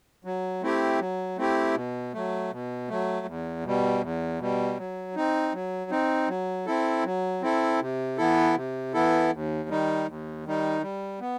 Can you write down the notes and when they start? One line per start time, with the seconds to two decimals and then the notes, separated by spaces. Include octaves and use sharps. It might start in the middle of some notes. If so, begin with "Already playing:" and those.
0.24 F#3
0.62 A3 C4 E4 G4
0.99 F#3
1.37 A3 C4 E4 G4
1.75 B2
2.14 F#3 A3
2.51 B2
2.88 F#3 A3
3.26 E2
3.64 B2 G3
4.01 E2
4.40 B2 G3
4.77 F#3
5.15 C4 D#4
5.53 F#3
5.91 C4 D#4
6.28 F#3
6.66 C4 E4 A4
7.05 F#3
7.42 C4 E4 A4
7.80 C3
8.17 E3 B3 E4 A4
8.55 C3
8.93 E3 B3 E4 A4
9.32 D#2
9.69 D#3 G3 D#4
10.07 D#2
10.45 D#3 G3 D#4
10.82 G3
11.20 B3